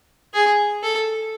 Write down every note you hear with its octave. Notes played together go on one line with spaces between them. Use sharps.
G#4
A4